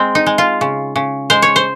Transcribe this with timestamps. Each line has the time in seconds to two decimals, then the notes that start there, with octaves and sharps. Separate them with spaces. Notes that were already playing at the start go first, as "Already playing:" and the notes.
Already playing: G#3 C4
0.15 D#4
0.26 G#3
0.38 F4
0.61 C#3
0.96 C#3
1.30 G#3 C5
1.42 C#5
1.56 C5